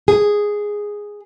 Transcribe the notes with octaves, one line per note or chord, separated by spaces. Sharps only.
G#4